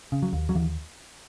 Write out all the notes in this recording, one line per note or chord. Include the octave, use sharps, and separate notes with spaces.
C#3
F#3
D#2
F#3
D#2 E3